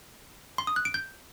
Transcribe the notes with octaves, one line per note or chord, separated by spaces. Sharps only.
C6
D#6
F#6
D7
G6